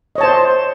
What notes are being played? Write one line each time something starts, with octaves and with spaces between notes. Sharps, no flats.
C5 C#5 D#5 A5